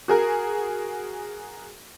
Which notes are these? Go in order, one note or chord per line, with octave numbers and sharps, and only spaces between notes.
F#4 G#4 A#4